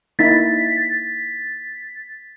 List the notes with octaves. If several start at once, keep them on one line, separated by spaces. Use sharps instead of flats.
A#3 D#4 E4 A6 B6